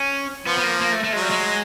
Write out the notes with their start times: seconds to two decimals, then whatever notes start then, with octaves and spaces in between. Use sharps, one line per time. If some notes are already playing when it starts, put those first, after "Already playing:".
Already playing: C#4
0.46 F3 B3
0.58 B3
0.63 A#3
0.81 A#3
0.92 A3
1.04 A3
1.13 F#3 G#3
1.22 G3
1.31 G#3